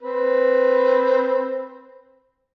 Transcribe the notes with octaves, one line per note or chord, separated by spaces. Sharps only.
C4 B4